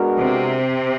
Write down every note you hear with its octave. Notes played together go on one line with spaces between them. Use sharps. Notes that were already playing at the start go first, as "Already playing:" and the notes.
Already playing: G#3 B3 D4 F#4 A#4
C3